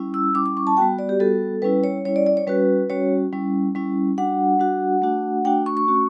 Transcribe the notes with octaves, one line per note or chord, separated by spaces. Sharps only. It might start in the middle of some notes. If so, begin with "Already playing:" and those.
Already playing: G3 C#4 E4
E6
G3 C#4 E4 D6
D6
C#6
A5
G3 B3 F#4 G5
D5
G4
G3 B3 F#4 A4
G3 C#4 E4 B4
C#5
G3 C#4 E4 C#5
D5
D5
C#5
G3 C#4 F#4 B4
G3 C#4 F#4 C#5
G3 C#4 E4
G3 C#4 E4
G3 D4 F#4 F#5
G3 D4 F#4
A3 D4 F#4
A3 D4 F#4 G5
C#6
C#6
A3 C#4 F#4